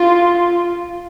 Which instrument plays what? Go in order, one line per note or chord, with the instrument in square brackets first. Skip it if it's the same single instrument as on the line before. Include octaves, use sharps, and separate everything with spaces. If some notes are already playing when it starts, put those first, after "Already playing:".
Already playing: [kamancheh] F4